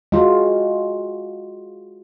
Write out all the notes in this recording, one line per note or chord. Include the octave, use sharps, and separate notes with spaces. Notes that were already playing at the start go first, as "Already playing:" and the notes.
G#3 F4 F#4